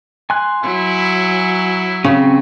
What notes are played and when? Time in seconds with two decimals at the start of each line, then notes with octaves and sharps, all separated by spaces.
0.30 G#5 C6 F#6
0.63 F#3 E4
2.04 C#3 C4 C#4